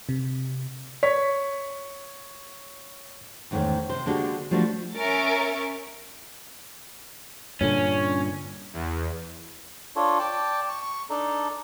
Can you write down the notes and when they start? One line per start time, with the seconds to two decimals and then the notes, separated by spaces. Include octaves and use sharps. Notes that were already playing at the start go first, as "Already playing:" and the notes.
0.09 C3
1.03 C#5 B6
3.51 E2 G#2 D#3 A3 C#4
3.89 C3 C5
4.06 D3 G#3 A#3 D4 F#4 G4
4.51 F3 G3 A3 D4 E4 F#4
4.96 C#4 A#4 E5 C#6 A6 D7
7.61 G2 A#2 D3 C#4
8.73 E2
9.96 D4 F4 A4 C#5
10.19 D5 G5 A5
10.69 C#6
10.82 C#6
11.10 D4 D#4 A4